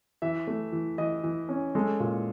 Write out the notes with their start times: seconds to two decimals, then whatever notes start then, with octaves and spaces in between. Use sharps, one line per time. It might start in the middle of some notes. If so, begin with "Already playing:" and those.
0.22 E3 E5
0.47 A3
0.73 E3
0.98 E3 D#5
1.24 E3
1.49 C#4
1.75 G#3 A4
2.00 A#2